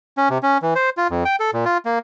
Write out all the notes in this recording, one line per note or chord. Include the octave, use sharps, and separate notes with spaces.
C#4
C3
C#4
E3
C5
F4
F2
G5
A4
A#2
F4
A#3